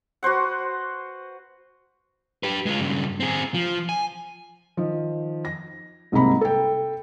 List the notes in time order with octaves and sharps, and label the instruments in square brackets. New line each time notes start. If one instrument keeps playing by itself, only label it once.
[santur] F#4 B4 C5 F#5
[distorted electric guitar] G4 B4
G#3 F4
G2 C#3
C4 G#4
F3
G#5
[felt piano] D#3 F3
A#6
C2 G#2 C3 A#3 A#5 B5
A4 G5